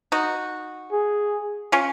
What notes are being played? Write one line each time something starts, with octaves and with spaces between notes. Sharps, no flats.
D#4 F#4
G#4
C#4 F4